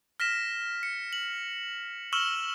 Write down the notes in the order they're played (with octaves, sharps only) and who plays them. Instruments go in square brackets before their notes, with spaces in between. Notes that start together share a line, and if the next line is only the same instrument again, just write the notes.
[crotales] F6 A#6 B6 E7
C#7
F#7
C#6 E6 F6 E7 F#7 G7